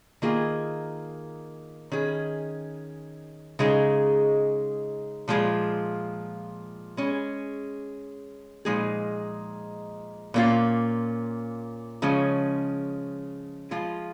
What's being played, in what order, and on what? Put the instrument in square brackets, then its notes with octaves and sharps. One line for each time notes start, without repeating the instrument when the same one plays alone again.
[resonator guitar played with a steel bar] D#3 A#3 F4 G#4
D#3 C#4 G#4
C#3 G#3 D#4 G#4
A#2 F3 G#3 F4
G#3 C#4 G#4
A#2 F3 G#3 D#4 G#4
A#2 A#3 C#4 F4
C#3 F3 G#3 C#4
F3 G#3 F4